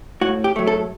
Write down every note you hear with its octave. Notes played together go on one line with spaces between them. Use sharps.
A2 F#4
G4
F#3 A3
A4